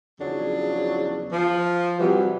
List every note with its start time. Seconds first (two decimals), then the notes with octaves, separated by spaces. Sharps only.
0.21 E2 C#3 F3 F#3 D4
1.32 F3
2.00 C3 E3 F#3 G3